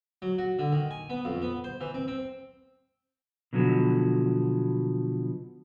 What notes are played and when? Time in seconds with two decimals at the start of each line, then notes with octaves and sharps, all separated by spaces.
0.22 F#3
0.38 F#4
0.59 D3
0.72 D#3
0.91 G#5
1.10 B3
1.25 F2
1.42 B3
1.64 C5
1.81 E3
1.94 C4
2.08 C4
3.53 B2 D3 F3 F#3 B3